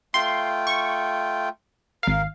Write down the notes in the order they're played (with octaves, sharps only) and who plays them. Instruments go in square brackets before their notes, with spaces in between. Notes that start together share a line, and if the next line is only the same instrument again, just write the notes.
[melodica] A3 F4 G5 [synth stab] C6
[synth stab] C#6
[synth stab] G#1 F5 [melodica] A#4